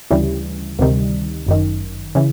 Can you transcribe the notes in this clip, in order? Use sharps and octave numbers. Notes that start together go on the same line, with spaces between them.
D2 C#3 E3 G3
D2 C3 D#3 G3
G1 F#2 D#3
C#3 E3